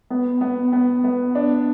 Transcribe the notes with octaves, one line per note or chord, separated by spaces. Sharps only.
B3
B3
B3
B3
D4